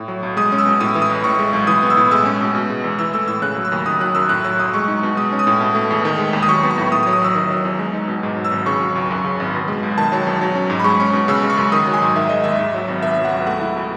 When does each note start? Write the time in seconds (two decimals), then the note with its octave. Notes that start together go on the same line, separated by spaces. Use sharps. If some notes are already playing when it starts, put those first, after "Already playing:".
Already playing: A2
0.08 F#3
0.23 B1
0.37 G#3 D#6
0.52 C#4
0.58 E6
0.65 B2
0.80 A2 D#6
0.95 E3
1.02 D#6
1.10 A1
1.24 A2 C#6
1.39 G#3
1.53 B1
1.67 E3 D#6
1.83 B3
1.90 E6
1.97 A2
2.11 G#3 E6
2.26 C#4
2.40 B2
2.55 B2
2.69 G#3
2.84 E2
2.99 E3 E6
3.14 A3 E6
3.28 A2 E6
3.42 C#3 F#6
3.57 F#3
3.65 E6
3.72 D#2
3.86 D#3 D#6
4.00 F#3 F#6
4.15 F#2 E6
4.29 A2 F#6
4.44 F#3 E6
4.59 B1 D#6
4.74 G#3 C#6
4.88 D#4
5.03 B2
5.17 G#3 D#6
5.32 C#4
5.39 D#6
5.47 A2
5.61 B2
5.75 A3
5.91 E2
6.05 D#3
6.18 G#3
6.33 D#2
6.43 D#6
6.48 F#3 C#6
6.63 B3
6.71 C#6
6.78 A2
6.92 A2 D#6
7.03 D#6
7.07 F#3
7.13 D#6
7.22 A1 E6
7.35 D#3
7.51 F#3
7.65 E2
7.79 G#3
7.93 D#4
8.08 B2
8.23 G#2
8.37 F#3
8.45 E6
8.51 G#1
8.66 C#3 C#6
8.81 F#3
8.95 C#2
9.11 F#2
9.24 C#3
9.40 G#1
9.53 B2
9.68 G#3
9.83 B1
9.98 D#3 A5
10.12 F#3
10.27 E2
10.41 F#3
10.55 C#4
10.70 G#2
10.80 B5
10.84 G#3 C#6
11.00 C#4
11.13 B2
11.28 C#3 E6
11.43 G#3
11.50 C#6
11.57 F#2
11.72 D#3 D#6
11.87 F#3
11.93 G#5
12.02 G#2
12.16 D#3 E5
12.29 G#3 D#5
12.44 D#2 E5
12.59 G#2
12.74 F#3
12.88 G#1
13.02 B2 E5
13.18 F#3
13.25 F#5
13.32 C#2
13.47 A3 F#5
13.61 E4
13.76 B2